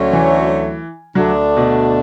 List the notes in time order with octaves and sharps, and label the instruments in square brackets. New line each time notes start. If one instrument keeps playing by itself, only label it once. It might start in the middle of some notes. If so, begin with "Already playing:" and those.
Already playing: [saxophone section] D2 D3 F#3 A3 C#4
[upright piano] E3
[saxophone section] D2 D3 A3 D4 [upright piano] F#3
[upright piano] B2